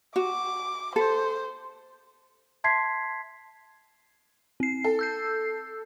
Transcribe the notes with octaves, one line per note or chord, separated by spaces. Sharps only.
F#4 D6
A4 C5
E5 A5 C6 G#6 B6 C7
C4 C7
A4
E6 G6 C7